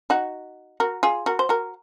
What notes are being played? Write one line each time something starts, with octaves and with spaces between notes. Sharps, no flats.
D#4 F#4
F#4 A#4
F4 G#4
F#4 A#4
C5
F#4 A#4